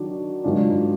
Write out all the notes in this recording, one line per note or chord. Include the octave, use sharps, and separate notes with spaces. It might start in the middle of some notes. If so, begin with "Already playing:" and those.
Already playing: D#3 F#3 D4 F#4
G#2 D#3 F#3 D4 F4